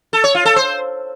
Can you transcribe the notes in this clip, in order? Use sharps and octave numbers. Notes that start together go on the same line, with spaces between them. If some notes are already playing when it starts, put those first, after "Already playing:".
A4
C#5
F4
A4
C5